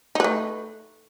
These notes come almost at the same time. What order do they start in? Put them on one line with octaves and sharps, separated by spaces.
D#4 B4 A3